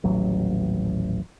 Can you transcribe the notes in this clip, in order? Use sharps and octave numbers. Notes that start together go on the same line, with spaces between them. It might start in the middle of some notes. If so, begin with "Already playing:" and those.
D#1 A1 F#3